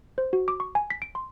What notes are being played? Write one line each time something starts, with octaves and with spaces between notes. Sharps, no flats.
C5
F#4
D6
C#6
G#5
B6
D7
C6